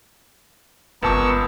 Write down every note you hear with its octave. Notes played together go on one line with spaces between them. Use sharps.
G1 C#2 B3 A#4 A5 C#6 D6 E6